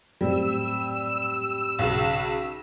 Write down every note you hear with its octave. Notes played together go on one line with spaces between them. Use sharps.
F#2 A2 G3 C4 E6
B1 C#3